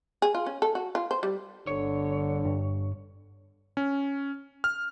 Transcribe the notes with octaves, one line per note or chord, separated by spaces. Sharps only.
G#4
F4
C#4
A4
F#4
F4
C5
G3
G1 D3 C#5
G2
C#4
F6